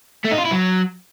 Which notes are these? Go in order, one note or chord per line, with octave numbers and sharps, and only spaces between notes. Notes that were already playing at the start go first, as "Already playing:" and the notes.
A3
D#4
F4
E4
F#3